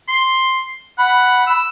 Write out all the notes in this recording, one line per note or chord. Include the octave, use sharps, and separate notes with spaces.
C6
F#5 B5
E6